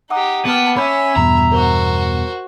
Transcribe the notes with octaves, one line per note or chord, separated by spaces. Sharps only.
D#4 G4 F#5 D6 D#6
A#3 B3 G5 A5 D6 F6
C#4 E5 B5 G6 G#6
E2 G2 B2 A#5
F#4 A#4 C5